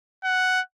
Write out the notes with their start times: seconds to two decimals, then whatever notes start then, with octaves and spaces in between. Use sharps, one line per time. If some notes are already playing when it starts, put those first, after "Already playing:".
0.24 F#5